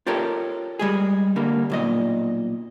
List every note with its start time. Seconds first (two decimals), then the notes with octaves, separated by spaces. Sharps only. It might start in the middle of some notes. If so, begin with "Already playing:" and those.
0.07 F4 G4 A4 A#4 C#5
0.79 G3 G#3 G#4
1.36 D3 G3 A#3
1.70 B1 A#2 D#5